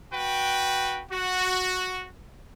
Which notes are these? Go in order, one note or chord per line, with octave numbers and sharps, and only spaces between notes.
F#4 B4 G5
F#4